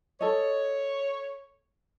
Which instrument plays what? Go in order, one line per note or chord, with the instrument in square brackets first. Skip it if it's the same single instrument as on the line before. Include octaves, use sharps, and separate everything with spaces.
[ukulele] A4 D#5 [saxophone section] C#5